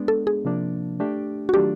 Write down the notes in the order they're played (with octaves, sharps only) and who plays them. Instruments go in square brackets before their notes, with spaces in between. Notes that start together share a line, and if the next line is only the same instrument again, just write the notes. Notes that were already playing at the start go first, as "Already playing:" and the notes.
Already playing: [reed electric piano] G#3 B3 D4
[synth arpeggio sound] A4
G#4
[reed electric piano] C3 F3 A#3 D4
A3 D4 G4
[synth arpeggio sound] F#4
[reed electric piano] D#3 F#3 A3 D4 F4 [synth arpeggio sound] G4